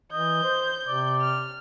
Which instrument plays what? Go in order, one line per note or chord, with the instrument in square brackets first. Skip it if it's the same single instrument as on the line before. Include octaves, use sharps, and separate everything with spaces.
[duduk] E3 [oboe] D#5 [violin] G6
[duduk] C5
[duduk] C3 [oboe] D5
[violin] F6